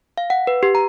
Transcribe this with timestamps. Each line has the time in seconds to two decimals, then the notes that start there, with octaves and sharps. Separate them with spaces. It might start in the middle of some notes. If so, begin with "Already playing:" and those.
0.18 F5
0.30 F#5
0.47 B4
0.63 G4
0.75 A#5